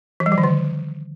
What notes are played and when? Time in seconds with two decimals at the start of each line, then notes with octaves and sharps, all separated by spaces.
0.20 E3
0.26 G3
0.32 F3
0.38 D#3
0.43 D3